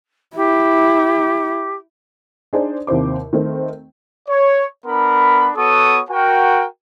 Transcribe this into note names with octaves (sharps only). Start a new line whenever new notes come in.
E4 G4
D4 D#4 G#4 C5 D5
D#2 C3 E4 C5 D6
D#3 A3 C4
C#5
B3 D4 A#4 B5
B3 F#4 A4 C#5 C#6 D#6
F#4 A#4 G5